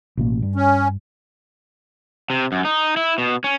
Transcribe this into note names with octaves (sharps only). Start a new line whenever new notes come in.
A1 B2 A#3
G2
C#4
C3
F#2
D#4
E4
B2
C#4